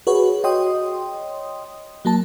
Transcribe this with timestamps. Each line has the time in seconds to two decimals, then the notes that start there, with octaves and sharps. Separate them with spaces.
0.07 F#4 G#4 B4 C#5 F#5
0.44 C#5 D#5 G5 C6 D#6
2.05 F#3 A#3 A5